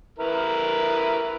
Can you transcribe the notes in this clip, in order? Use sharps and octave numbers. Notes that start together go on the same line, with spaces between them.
E4 A#4 B4